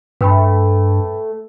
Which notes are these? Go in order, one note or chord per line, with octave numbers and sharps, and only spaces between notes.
G2 A3 B4 G5 B5